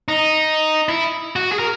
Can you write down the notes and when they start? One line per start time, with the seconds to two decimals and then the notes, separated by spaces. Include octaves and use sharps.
0.08 D#4
0.89 E4
1.36 F#4
1.52 G#4
1.59 A#4